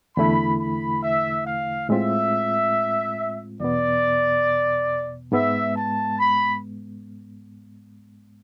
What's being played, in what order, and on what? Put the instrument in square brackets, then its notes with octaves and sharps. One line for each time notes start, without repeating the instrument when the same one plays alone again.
[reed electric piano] E2 D3 A3 E4 [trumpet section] B5
[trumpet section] B5
E5
F5
[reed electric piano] A2 G#3 C4 F4 [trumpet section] E5
[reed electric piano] E2 B2 B3 [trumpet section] D5
[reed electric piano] G#2 G#3 B3 [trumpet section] E5
[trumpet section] A5
B5